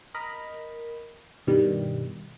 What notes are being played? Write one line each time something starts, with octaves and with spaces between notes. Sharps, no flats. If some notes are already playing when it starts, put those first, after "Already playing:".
A#4 D#5 A#5 B5
G2 B2 D#3 G3